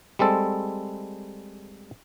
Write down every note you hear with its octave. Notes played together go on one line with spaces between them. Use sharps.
G3 G#3 C4 A4